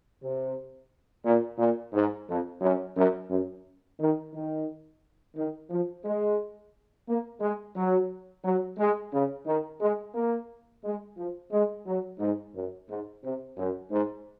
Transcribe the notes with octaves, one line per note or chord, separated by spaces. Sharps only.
C3
A#2
A#2
G#2
F2
F#2
F#2
F#2
D#3
D#3
D#3
F3
G#3
A#3
G#3
F#3
F#3
G#3
C#3
D#3
G#3
A#3
G#3
F3
G#3
F#3
G#2
F#2
G#2
C3
F#2
G#2